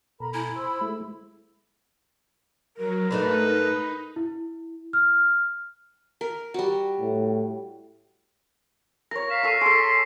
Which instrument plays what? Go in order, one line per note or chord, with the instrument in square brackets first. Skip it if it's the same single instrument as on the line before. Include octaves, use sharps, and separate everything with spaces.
[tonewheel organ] B2 A4 [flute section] A#4 A#5 B5
[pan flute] E4 [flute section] G#5 A#5
[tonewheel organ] C5 [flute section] B5 E6
[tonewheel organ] G#3 A3 E4
[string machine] F#3 [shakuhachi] A#4
[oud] G#2 A3 D4 [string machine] D#4 [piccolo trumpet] B4
[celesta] E4
F6
[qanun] A#4
G3 F#4
[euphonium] A2
[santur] A#4 C#5 [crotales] A#6
[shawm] F5 [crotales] B6 E7
[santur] A4 C#6 [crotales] C7 D#7
[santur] G#4 A4 [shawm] C6 [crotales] D7